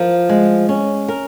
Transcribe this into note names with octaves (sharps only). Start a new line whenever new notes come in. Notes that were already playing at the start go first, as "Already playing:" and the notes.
Already playing: F3 A#4
G#3
C#4
A#4